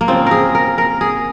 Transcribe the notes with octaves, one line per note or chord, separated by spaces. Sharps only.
A#3
C#3 F3 C4
G#4 A#4
A#4
A#4
G#4